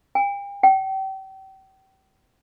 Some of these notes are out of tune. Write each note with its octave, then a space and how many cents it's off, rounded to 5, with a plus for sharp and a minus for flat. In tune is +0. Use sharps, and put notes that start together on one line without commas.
G5 +40
G5 -35